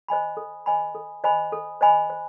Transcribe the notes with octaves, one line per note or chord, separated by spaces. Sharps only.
C5 D#5 G#5 B5
A4
C5 D#5 G#5 B5
A4
C5 D#5 G#5 B5
A4
C5 D#5 G#5 B5
C5